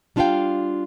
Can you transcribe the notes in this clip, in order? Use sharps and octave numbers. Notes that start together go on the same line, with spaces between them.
G3 D4 F4 E5 F5 G5